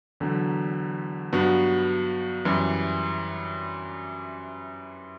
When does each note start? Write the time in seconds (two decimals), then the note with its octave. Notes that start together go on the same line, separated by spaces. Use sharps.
0.20 E2 D3 F#3
1.33 G2 F#3 B3 F#4
2.45 F#2 E3 G3